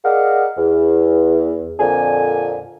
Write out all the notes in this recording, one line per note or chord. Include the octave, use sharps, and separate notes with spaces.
G#4 A#4 D5 D#5 F5 F#5
E2
F2 A#2 D3 G#5